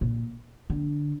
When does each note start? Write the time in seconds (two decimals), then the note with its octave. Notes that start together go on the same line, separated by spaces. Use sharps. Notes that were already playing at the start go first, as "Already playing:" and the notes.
0.01 A#2
0.70 D3